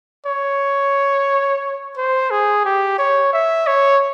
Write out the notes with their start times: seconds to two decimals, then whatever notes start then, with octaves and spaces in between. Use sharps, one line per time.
0.26 C#5
1.97 C5
2.31 G#4
2.65 G4
2.98 C#5
3.33 E5
3.67 C#5